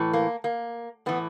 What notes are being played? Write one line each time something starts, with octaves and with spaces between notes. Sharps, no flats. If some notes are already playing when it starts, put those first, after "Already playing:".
Already playing: A2 E3
A#3
A#3
A2 E3 B3